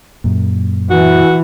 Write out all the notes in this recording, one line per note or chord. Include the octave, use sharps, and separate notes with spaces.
F#2 A#2
E3 F#4